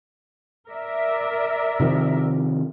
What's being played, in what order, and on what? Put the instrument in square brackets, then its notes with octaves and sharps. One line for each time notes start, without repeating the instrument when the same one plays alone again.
[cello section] A#4 D5 E5
[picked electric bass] C3 D#3 F3